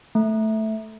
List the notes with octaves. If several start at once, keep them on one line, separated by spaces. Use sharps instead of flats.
A3